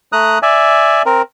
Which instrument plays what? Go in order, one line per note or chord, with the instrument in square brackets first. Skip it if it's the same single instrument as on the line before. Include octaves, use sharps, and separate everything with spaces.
[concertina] A3 A#5 D#6 F#6
D5 E5 G#5
C4 A#4